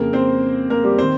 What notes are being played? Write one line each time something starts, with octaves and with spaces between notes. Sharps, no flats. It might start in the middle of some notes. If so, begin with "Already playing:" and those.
Already playing: F2 C#3 A#3 A#4
C4 C5
A#3 A#4
G3 G4
D#3 C4 C5